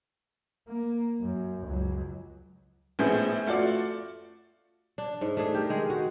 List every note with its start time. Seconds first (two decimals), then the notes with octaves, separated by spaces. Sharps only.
0.67 A#3
1.20 F#2
1.66 C#2 F#3
2.99 A#1 A2 B3 C4 G#4 G6
3.46 A3 F4 F#4 D5
4.98 D4
5.21 G#2
5.37 A3 D4 G#4
5.54 G4 A#4
5.69 D#3 G#3 G#4
5.90 F#4